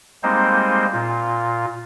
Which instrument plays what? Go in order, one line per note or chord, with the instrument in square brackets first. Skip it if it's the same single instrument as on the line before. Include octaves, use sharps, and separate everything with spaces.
[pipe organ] G3 G#3 A#3 C4 D#4 C5
A#2 F4